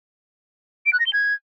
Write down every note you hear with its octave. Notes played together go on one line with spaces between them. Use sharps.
D7
F#6
A#6
G7
G#6